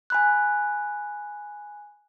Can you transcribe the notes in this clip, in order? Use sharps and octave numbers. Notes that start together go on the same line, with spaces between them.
G#5 B5 F#6